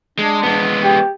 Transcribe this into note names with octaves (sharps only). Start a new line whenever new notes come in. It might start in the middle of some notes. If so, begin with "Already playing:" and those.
G#3 D4
G#3 B3
G4